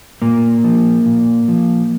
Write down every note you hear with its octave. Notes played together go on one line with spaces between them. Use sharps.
A#2 A#3
F3
A#2
F3